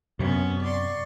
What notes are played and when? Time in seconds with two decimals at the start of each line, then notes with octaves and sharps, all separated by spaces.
0.19 F#2 C3 B3 C#4
0.62 D5 C6 C#6